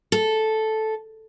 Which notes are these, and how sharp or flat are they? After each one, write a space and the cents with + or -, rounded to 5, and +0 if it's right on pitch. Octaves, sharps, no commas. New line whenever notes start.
A4 -5